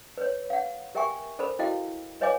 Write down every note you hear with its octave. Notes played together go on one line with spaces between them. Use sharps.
B4 C#5
F5 F#5
G4 A#4 E5 G5 G#5 C#6
A4 A#4 C5 B5
E4 F#4 A4 D#5 F5 G5
B4 C#5 D#5 F5 G#5 D6